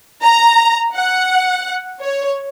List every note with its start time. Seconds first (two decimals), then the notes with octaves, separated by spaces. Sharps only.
0.22 A#5
0.94 F#5
2.02 C#5